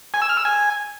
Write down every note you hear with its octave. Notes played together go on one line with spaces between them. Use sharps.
G#5
E6
F6
E6
G#5